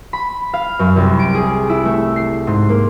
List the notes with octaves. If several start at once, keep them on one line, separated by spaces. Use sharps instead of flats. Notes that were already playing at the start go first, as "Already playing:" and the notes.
B5
F5
F#2
C2
D7
G#4
E4
A3
C7
G#2
A#3